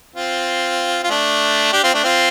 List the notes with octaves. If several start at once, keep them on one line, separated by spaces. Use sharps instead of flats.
C4 F4
F4
A3 D4
D4 G4
C4 F4
A3 D4
C4 F4